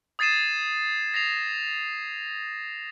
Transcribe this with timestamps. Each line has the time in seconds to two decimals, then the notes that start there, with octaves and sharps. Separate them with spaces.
0.19 D#6 G#6 A6 C7 D#7 E7
1.14 A#6 C7 F7